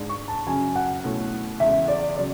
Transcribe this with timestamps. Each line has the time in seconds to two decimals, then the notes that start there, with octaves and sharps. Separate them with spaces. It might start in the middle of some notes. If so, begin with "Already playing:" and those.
Already playing: G#2 G#3 D4
0.09 C#6
0.28 A5
0.47 F#2 C#3 F#3 G#5
0.76 F#5
1.04 B2 A3 C#4 E4
1.60 E2 C#3 G#3 E5
1.88 D5
2.17 C#3 F#3 D5